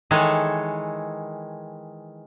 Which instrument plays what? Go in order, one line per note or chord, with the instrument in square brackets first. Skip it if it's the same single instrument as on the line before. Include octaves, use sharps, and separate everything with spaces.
[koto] D#3 E3 G#3 A4 C#5